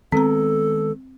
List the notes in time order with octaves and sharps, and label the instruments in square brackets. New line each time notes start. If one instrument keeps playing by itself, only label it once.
[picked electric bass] D#3 G#3 B3 [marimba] C4 A#5 [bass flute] A4